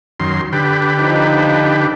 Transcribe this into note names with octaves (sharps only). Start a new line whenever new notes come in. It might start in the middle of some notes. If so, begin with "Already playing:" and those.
F#2 D#3 C6
D3 G4 B4
F3 D#4